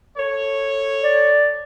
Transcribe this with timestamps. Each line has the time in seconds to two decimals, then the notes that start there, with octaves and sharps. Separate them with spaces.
0.18 A4 C#5
1.04 D5